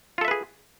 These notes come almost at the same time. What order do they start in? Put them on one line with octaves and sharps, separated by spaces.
F4 A4 E5 B4 G#4